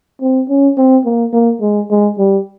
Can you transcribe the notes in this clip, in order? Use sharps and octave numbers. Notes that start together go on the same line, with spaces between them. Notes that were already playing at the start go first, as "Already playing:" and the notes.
C4
C#4
C4
A#3
A#3
G#3
G#3
G3